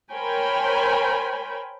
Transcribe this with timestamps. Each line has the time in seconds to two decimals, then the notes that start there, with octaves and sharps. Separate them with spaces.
0.11 A#4 C5 C#5 G5 G#5 B5